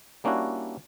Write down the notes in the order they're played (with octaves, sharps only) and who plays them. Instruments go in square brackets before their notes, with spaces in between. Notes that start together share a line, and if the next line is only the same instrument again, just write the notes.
[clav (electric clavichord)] G3 A#3 C#4 D4 E4 F#4